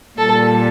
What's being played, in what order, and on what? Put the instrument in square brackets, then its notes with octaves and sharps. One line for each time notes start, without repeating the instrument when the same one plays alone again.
[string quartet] A#2 G3 A4